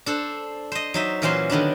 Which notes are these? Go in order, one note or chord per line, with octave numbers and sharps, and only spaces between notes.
D4 A4 C5
C5 D#5
F#3 D#4 E5
A#2 E3 F#3 C#4 C5 C6
D3 D#3 B3 D4